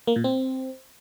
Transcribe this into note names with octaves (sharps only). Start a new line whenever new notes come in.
A#3
A#2
C4